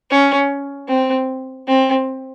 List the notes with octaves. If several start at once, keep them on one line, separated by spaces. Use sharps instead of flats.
C#4
C4
C4